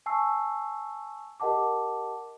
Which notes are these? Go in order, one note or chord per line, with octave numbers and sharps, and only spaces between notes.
G#5 A5 C#6 E6 C7
G4 A#4 D#5 F#5 A5 D6